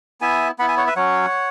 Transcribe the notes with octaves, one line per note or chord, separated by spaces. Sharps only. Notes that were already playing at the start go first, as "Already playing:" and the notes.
B3 E4 E5 G#5
B3 E4 F#5 B5
E5 G#5
C#5 F#5
B4 E5
F#3 C#4 F#4 C#5 F#5